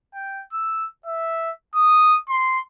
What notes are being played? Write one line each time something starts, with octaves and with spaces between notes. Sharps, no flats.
G5
E6
E5
D#6
C6